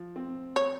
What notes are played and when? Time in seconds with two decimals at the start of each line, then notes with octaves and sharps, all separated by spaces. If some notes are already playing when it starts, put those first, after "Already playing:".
Already playing: F3
0.16 C4
0.56 C#5